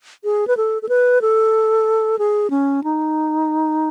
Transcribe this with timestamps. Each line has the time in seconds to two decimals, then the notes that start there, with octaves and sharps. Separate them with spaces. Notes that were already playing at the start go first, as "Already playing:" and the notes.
0.24 G#4
0.47 B4
0.57 A4
0.82 A4
0.89 B4
1.21 A4
2.19 G#4
2.50 C#4
2.84 D#4